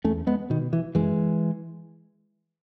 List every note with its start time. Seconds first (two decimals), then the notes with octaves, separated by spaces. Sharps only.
0.04 E2 A3 C#4
0.27 G#3 B3
0.50 B2 D#3
0.73 E3
0.95 F#2 E3 G#3